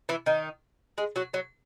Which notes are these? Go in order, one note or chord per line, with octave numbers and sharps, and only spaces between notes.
E3 E4
D#3 D#4
G#3 G#4
F#3 F#4
F#3 F#4